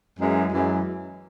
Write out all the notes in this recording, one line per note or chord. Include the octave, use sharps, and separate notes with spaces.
F#2 E3 G#3
F#2 E3 G#3